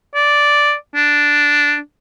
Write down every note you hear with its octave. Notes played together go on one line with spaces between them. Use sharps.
D5
D4